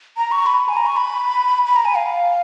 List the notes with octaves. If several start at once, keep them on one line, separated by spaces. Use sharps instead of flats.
A#5
C#6
B5
G#5
A#5
C#6
B5
B5
A#5
G#5
F5